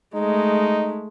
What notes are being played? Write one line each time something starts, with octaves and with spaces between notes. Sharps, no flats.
G#3 A3 D#4